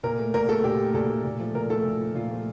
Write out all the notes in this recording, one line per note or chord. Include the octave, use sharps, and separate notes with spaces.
A#2 A#4
A3
A#2 A#4
A3 A4
A#2 G4
A3
A#2 A4
A3
A#2
F3 A3
A#2 A#4
F3 A3 A4
A#2
F3 A3
A#2 F4
F3 A3